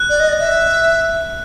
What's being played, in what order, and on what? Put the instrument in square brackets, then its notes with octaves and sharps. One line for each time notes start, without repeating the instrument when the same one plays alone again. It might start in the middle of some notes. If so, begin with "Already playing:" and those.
Already playing: [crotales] F#6
[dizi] D5
D#5
D5
E5